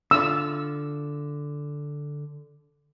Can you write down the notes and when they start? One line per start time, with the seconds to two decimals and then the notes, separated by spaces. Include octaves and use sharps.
0.11 D3 F4 E6